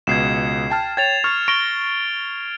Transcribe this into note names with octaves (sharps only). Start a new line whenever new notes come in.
C#2 B2 G#6 C7 E7
G5 A5 F6
C#5 G5 G#6 A6 F7
C#6 F6 A6
C#6 A#6 D7 G7